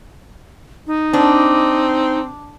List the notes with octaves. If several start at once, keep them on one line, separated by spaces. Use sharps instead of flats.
D#4
C4 D4